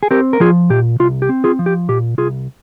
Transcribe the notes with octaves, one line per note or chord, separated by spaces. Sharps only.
G#4
C4 G4 A#4
A#4
F3 F4 G#4
A#2 G4
C2 F4
G4
C4
F4 G#4
F3
G4
A#2 G4
C2 F4 G#4